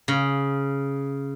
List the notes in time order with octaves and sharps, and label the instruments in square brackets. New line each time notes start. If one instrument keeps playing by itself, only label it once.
[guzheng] C#3